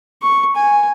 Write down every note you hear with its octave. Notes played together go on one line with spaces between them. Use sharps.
C#6
G#5